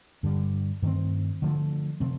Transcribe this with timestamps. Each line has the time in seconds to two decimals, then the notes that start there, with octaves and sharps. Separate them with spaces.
0.23 G2 D3 G3
0.82 G2 D#3 A3 C4
1.42 D3 F3 A3
2.00 C3 F3 A3 C4